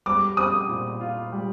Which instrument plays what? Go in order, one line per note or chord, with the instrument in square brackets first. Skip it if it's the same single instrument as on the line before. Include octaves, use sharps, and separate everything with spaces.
[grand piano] G3 [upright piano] D6
[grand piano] C4 [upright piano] D#6
[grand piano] A#2
F4
G3